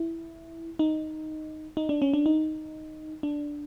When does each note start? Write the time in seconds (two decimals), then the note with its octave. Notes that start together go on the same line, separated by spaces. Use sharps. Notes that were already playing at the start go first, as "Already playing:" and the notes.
Already playing: E4
0.79 D#4
1.77 D#4
1.89 D4
2.02 C#4
2.14 D4
2.26 D#4
3.23 D4